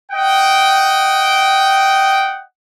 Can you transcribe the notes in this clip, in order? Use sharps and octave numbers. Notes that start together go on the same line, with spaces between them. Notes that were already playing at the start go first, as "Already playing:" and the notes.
D#5 F#5 G5